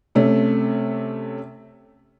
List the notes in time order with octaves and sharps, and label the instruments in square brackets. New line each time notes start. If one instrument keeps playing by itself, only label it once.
[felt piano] C3 A3 C#4